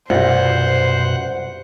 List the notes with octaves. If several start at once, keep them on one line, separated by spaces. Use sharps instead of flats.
C2 F#2 B2 F4 G4 C5 F#5